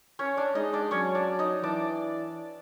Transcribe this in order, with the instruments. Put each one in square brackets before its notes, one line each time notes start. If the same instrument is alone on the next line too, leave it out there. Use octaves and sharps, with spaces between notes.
[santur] C#4 C#5
D4 D5
[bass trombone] G#3 [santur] D#4 D#5
[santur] D4 D5
[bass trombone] F#3 [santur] C#4 C#5
[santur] D4 D5
D#4 D#5
[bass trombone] E3 [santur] D4 D5